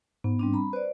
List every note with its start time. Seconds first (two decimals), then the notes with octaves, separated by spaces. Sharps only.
0.24 G#2 B3
0.39 G3 C4 D4
0.53 A#5 B5
0.73 B4 C5 D5